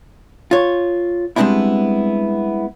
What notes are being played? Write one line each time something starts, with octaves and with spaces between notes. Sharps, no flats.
F4 C#5
G3 G#3 B3 C4 D4 E4